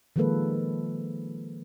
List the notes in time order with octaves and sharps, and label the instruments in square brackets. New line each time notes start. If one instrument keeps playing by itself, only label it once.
[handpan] D#3 F3 G#3 A#3 A4 B4